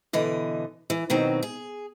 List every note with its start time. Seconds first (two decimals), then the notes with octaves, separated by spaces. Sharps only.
0.13 B2 D3 E3 D#5
0.90 E3
1.10 B2 D#3 F#3 C4
1.43 G#4